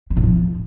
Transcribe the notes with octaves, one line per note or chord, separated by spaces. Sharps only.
D3
A2
F3